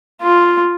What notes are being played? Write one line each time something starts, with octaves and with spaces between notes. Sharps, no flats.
F4